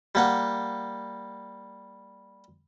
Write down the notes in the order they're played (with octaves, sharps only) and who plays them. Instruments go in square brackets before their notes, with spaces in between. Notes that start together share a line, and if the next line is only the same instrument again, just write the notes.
[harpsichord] G3 A#3 F#5